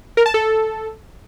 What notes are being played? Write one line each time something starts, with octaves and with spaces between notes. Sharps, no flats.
A#4
A5
A4